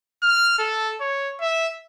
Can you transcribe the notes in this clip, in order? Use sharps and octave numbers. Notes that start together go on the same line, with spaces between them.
F6
A4
C#5
E5